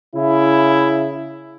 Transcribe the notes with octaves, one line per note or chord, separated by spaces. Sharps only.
C#3 E4